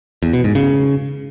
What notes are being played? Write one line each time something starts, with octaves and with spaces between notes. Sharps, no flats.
E2
B2
G#2
C#3